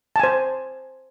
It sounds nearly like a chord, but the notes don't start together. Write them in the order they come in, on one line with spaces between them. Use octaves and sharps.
A5 G#5 C5